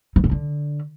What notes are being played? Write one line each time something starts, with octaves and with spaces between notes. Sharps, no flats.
E3
C#3
D3